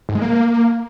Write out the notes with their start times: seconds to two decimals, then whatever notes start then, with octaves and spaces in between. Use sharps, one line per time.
0.09 G#2
0.15 G#3
0.22 A#3